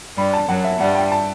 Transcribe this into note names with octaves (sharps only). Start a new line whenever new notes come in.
G2 G3 B5
A5
F#2 F#3 F#5
E5
G2 G3 F#5
G5
A5